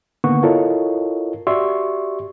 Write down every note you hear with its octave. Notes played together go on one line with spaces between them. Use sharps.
D3 D#3 A#3 B3 F#5 C#6
E4 F4 A4 A#4 C#5 D#5
F#4 G4 D5 E5 C6 C#6